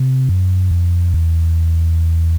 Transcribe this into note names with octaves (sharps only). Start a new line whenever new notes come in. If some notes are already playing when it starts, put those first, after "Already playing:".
Already playing: C3
F#2
F2
E2